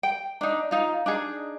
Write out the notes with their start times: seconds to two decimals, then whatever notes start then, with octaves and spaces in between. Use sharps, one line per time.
0.03 G5
0.41 D4 D#4
0.71 D#4 F4
1.06 D4 D#4 G#4